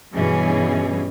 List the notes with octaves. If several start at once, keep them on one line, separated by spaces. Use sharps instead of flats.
G2 B2 E3 C#4 G#4